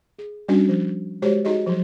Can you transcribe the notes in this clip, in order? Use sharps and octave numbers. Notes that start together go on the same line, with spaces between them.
G#4
G3 C#4 D4 F#4
F3
G#3 F#4 G4 C5 C#5
D#4 F#4 G#4 D#5
F3 F#3